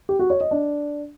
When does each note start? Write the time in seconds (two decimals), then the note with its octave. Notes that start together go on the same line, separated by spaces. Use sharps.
0.09 G4
0.19 F#4
0.30 C#5
0.41 D#5
0.51 D4